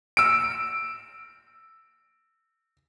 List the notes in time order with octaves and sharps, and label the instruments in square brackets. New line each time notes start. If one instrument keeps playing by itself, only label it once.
[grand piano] E6 D7